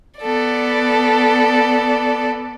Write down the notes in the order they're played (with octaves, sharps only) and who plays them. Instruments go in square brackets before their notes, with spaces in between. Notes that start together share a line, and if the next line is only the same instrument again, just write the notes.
[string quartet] B3 A4 D5